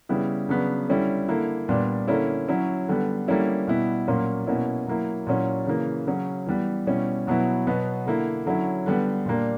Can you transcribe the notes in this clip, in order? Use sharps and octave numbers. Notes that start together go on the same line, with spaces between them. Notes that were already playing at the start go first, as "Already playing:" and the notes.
C#3 G3 B3 E4
C#3 F#3 B3 D4
D3 G3 C#4 E4
D3 A#3 E4
A#2 G3 B3 D4
D3 A#3 C#4 E4
F#3 C#4 E4
D3 G3 B3
D3 G3 A#3 C#4 E4
B2 G3 B3 E4
A#2 F#3 A#3 C#4
B2 A#3 C#4 E4
F#3 A#3 E4
A#2 F#3 C#4 E4
C#3 E3 A#3
C#3 F#3 C#4
E3 G3 B3
B2 G3 C#4 E4
B2 F#3 B3 E4
B2 F#3 B3
D3 A#3 E4
D3 F#3 C#4 E4
D3 G3 B3
A#2 G3 A#3 D4